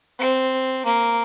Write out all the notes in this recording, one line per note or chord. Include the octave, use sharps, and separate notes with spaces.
C4
A#3